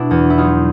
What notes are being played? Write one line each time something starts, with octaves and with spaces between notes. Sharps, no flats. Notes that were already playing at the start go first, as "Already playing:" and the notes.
Already playing: B2 D4 E4
E2
E4
F#3 D#4 F4